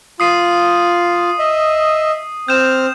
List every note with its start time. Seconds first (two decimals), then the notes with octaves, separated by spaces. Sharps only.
0.20 F4 D#6 C7 D#7
1.39 D#5 E5
2.48 C4 F6 G6 E7